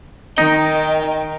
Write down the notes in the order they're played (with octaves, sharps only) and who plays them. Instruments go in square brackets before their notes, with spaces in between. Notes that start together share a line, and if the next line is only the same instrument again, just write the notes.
[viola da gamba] D#3 [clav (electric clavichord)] D#4 [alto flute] D#5 [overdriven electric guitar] G5